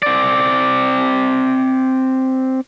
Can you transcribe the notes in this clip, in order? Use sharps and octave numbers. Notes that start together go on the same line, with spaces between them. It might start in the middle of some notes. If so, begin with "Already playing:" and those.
C4 D5